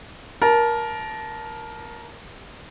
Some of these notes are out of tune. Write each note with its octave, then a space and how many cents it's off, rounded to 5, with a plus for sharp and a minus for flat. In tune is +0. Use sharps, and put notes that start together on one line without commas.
A#4 +15 A5 -10